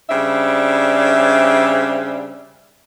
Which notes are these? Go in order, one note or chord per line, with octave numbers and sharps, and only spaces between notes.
C#3 G3 C4 D4 E5